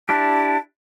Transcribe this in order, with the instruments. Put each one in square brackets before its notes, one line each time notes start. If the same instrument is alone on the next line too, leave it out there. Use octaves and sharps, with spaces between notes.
[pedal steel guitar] D4 E4 G4 [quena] A5